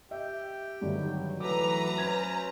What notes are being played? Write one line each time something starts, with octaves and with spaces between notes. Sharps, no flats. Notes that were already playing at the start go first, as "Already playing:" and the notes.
G4 E5 G5
G2 D3 D#3 F#3
E3 F#3 A3 A4 B4 A#5 D6
C#4 C5 G#6